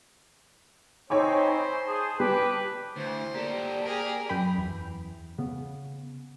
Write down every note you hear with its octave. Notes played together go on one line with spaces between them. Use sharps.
C4 D#4 C5 C#5 G5 G#5 B5 D6
G#4 A5
G3 B4 G5 A5 D6
D2 E4 C5
A#3 G4 A4 D5
G4 G#4 A#4
F#2 G5 B5
E2
C#3 B3